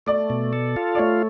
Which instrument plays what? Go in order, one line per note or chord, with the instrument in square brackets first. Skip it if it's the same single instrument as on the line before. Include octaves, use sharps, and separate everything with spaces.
[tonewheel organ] A3 [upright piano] D5
[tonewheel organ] B2
A4
F4
[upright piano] D5
[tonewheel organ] A3 [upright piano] C#5